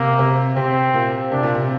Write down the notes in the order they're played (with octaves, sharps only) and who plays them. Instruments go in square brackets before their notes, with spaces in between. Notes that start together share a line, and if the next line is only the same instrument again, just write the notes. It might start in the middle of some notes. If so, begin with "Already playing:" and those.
Already playing: [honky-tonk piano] C3 [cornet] A#3
[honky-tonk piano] C3
[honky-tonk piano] C3 [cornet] C4
[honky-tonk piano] A#2
[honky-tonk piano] C3 [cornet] D4
[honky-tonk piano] A#2
C3